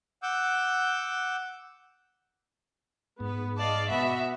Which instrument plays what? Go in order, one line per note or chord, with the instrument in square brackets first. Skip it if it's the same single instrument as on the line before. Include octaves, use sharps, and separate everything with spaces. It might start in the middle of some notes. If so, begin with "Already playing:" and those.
[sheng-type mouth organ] F#5 D6 E6 G6
[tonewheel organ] G#2 [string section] B3 B4
[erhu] D5 [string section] D#5 F5 A5
[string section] B2 B3 F#4 [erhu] E5